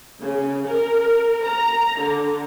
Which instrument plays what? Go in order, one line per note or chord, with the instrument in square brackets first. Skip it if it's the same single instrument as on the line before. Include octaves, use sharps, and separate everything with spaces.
[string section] C#3
A#4
A#5
D3